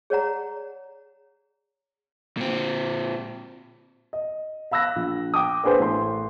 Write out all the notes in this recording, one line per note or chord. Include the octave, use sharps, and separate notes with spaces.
G#4 C#5 D5 F#5 A#5
A#2 C4
D#5
F5 B5 E6 F#6 A#6
A#1
G5 D6 D#6
A#3 D4 G#4 B4 C5
A1 A3 C6